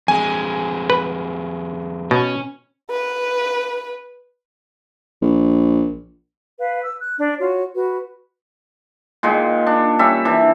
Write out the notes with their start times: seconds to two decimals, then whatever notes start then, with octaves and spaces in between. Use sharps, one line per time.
0.08 F2 G#3 G#5
0.90 B4
2.11 B2 C#4
2.91 B4
5.22 A#1
6.59 B4 F5
6.84 E6
7.01 F#6
7.18 D4
7.39 F4 F#4 C#5
7.75 F#4 B4
9.23 A#2 D#3 G#3
9.67 D4
9.99 G3 C#4 E5
10.25 E3 D4